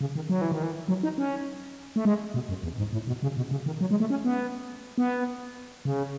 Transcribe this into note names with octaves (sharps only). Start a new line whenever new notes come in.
C#3
D#3
F#3
E3
D#3
E3
F#3
D#4
C#4
A3
G#3
B2
F#2
E2
G#2
A2
B2
C#3
B2
C#3
D#3
F#3
G#3
A3
C#4
B3
B3
C#3